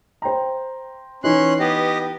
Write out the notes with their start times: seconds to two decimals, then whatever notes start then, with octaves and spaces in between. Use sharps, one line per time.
0.22 C5 G5 A#5
1.24 E3 C#4 D#4 C6 F#6
1.60 B3 G4 D#5